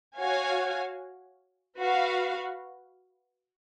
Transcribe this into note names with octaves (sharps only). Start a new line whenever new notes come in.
F#4 C#5 F5 G#5
F#4 B4 F5